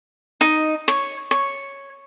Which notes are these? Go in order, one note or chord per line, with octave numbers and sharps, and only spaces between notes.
D#4
C#5
C#5